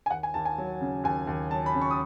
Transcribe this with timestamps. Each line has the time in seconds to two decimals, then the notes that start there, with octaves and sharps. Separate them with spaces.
0.06 G#5
0.10 D#2 F#5
0.23 G#5
0.34 D#2 A5
0.45 G#5
0.58 F#3
0.81 C#3
1.04 D#2 G#5
1.27 D#2
1.51 F#3 A5
1.66 B5
1.75 C#3
1.81 C#6
1.91 D#6